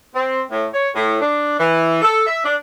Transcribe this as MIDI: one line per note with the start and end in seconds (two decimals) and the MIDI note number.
0.14 0.41 60
0.51 0.67 45
0.74 0.89 73
0.95 1.18 45
1.21 1.58 62
1.59 2.01 52
2.02 2.26 69
2.26 2.43 76
2.45 2.55 62